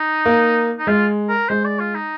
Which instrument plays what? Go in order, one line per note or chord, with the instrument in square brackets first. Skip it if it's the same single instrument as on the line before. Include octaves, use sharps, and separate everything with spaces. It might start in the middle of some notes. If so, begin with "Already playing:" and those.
Already playing: [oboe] D#4
[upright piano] A#3
[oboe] D#4
[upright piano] G#3 [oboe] F4
[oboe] A#4
[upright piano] G#3 [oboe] C5
[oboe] D5
F4
D#4